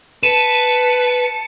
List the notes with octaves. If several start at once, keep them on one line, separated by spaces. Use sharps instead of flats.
B4 A5 C#7 D#7 E7